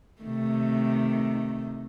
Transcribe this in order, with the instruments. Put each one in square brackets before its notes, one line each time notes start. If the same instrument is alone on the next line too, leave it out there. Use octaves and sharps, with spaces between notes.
[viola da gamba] C3 D#3 A3